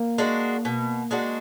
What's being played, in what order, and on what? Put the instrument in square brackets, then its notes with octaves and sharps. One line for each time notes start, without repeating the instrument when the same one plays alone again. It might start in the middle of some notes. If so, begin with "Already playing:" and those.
Already playing: [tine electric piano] A#3
[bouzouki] G#3 D4 F#4
B2
G#3 D4 F#4